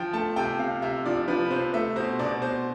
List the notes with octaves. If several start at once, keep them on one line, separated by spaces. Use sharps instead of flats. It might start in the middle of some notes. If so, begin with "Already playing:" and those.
Already playing: F3 G5
A3 A5
C3 G5
C3 F5
C3 E5
F3 D5
F3 B4
B4
C3 C5
A3 E5
B2 C5
B2 D5
B2 C5